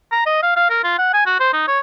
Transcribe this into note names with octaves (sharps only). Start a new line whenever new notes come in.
A#5
D#5
F5
F5
A#4
F4
F#5
G#5
F#4
C5
D#4
C#5